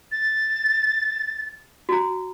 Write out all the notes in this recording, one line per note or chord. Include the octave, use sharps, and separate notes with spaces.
A6
F#4 A#5